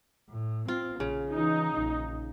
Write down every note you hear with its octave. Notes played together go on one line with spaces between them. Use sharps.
A2
C4 F4
A#1 C#3
E3 D#4
A#1